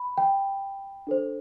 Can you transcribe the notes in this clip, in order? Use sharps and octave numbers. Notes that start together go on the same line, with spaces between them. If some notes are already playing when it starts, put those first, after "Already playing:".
Already playing: B5
G5
D4 A4 C5